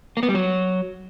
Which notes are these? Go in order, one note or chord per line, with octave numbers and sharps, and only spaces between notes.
A#3
B3
G3
F#3